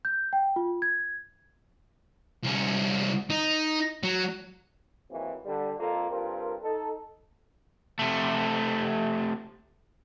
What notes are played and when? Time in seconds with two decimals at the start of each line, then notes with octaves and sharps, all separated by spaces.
0.05 G6
0.33 G5
0.56 F4
0.82 G#6
2.44 C2 C#4
3.30 D#4
4.03 F#3
5.10 G#1 D#2 E3 F#3 A#3 C4
5.45 D3 G3
5.79 F2 A#3 F4 A4
6.10 G2 C4 F4 A4 A#4
6.62 D#4 A4
7.99 C3 A3